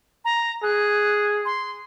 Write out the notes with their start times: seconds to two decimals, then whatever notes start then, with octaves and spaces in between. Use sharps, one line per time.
0.25 A#5
0.63 G#4 F#6
1.45 C6